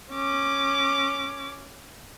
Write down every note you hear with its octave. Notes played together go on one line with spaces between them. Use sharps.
C#4 D6